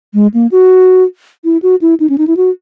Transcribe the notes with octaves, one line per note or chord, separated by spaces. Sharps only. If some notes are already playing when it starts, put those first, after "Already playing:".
G#3
A#3
F#4
E4
F#4
E4
D#4
C#4
D#4
E4
F#4